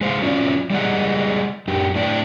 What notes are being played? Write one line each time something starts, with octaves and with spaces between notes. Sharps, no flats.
G#3 C5 F5
F#3 C#4 F4 D5
G3 G#3 D5 D#5 F#5
F#2 G4
A2 D4 F#5 G5